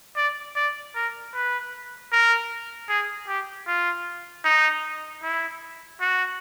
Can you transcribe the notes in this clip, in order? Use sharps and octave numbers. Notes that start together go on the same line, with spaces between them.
D5
D5
A#4
B4
A#4
G#4
G4
F4
D#4
E4
F#4